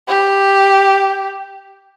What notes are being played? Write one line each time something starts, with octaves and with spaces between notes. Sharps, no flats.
G4